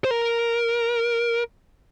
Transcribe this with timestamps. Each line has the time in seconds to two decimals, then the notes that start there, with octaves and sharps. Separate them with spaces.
0.05 C5
0.11 A#4